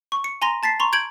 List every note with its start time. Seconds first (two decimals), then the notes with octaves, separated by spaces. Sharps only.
0.12 C#6
0.24 C#7
0.42 G#5 A#5 C6 A#6 G7
0.63 A5 A6 B6 C7
0.80 A#5 C6 C#6
0.93 G6 G#6 D7 F#7